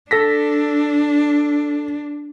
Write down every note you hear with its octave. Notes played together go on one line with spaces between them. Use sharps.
D4 A4 A#6 B6